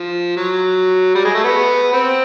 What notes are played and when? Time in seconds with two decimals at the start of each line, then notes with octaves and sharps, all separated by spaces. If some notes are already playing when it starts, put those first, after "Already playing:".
Already playing: F3
0.37 F#3
1.15 G3
1.25 G#3
1.34 A3
1.44 B3
1.93 C4